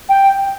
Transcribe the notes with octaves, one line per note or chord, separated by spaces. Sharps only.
G5